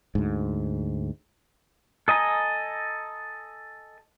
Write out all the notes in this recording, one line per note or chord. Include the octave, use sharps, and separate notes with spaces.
D2 G#2
A4 D#5 G#5 A#5